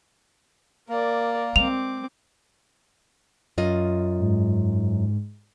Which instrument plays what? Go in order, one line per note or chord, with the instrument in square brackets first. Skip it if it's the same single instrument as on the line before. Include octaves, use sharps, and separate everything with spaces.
[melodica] A#3 [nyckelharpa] A#4 D5
[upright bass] G#3 [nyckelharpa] C4 D6 [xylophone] F7
[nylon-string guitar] F#2 F4 D#5
[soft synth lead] G#2